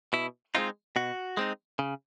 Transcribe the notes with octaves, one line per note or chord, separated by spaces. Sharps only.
B2 E4
G#3 C4 D#4 F4
B2 F#4
G#3 C4 D#4
C#3